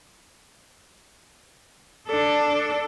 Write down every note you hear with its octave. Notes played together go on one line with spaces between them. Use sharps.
D4 A4